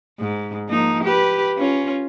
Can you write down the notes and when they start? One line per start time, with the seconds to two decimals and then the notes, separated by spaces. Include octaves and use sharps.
0.19 G#2
0.68 F3 A#3 D#4
1.04 G4 B4
1.58 C#4 F4